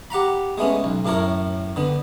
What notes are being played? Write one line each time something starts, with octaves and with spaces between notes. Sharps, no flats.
G4 F#5 A#5 B5
G#3 A3 B3 C#4
B1
F#2 A2 A4 A#4 C#5
D3 B3